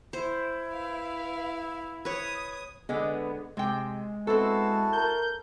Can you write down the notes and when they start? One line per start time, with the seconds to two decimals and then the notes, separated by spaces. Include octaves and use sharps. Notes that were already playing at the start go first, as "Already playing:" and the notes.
0.13 E4 C5
0.73 B4 F5
2.05 B4 C#5 D#6 G#6
2.89 D3 G#3 B3
3.57 C3 G#3 G5
4.27 B3 C4 E4 F#4 A4 A5
4.93 A#4 G6